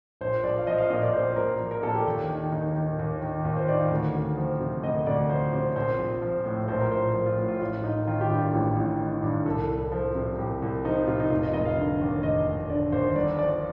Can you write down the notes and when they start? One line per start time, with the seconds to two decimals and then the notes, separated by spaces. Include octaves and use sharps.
0.21 A#1 C5
0.44 A#1 D5
0.58 F5
0.67 F3 D#5
0.78 F5
0.90 A#2 D#5
1.02 D5
1.14 A#1 C5
1.32 C5
1.36 A#1 A#4
1.60 F3
1.71 A#4
1.83 A#2 A4
1.95 G4
2.06 D#2
2.29 D#3
2.52 D#2 D#4
2.75 D#3
2.99 D#2
3.22 D#3
3.45 D#2 F4
3.57 C5
3.67 D#3 D5
3.79 F5
3.91 D2
4.14 D2
4.37 F3
4.60 C3
4.83 D2 D#5
5.06 D2 D5
5.29 F3 C5
5.53 C3 C5
5.76 A#1 C5
5.99 A#1
6.22 F3
6.46 A2
6.68 A#1 C5
6.81 A#4
6.92 A#1 C5
7.14 F3
7.26 F4
7.38 A2
7.49 F4
7.61 A1 F4
7.84 A1 D#4
8.07 D#3 F4
8.21 G4
8.30 G2 F4
8.53 A1 G4
8.76 A1
8.99 D#3
9.23 G2
9.46 C2 A4
9.69 C2
9.92 F3
10.15 C3
10.38 C2 G4
10.62 C2
10.84 F3 D#4
11.07 C3 F4
11.20 D#4
11.30 F1 F4
11.43 D#5
11.53 F1 D#5
11.66 F5
11.77 D3
12.01 D#2
12.23 F1 D#5
12.46 F1
12.70 D3 D5
12.92 D#2 C5
13.16 G1 D5
13.39 F3 D5